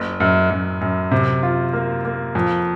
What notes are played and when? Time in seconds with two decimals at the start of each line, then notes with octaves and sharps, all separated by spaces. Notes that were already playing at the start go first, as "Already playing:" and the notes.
Already playing: F#1
0.20 F#2
0.50 F#2
0.81 F#2
1.11 C3
1.43 F4
1.73 A#3
2.05 A#3
2.35 F2